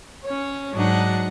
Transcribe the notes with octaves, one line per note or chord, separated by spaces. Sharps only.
C#4 C#5
G#2 F#3 D4 D#4 F#5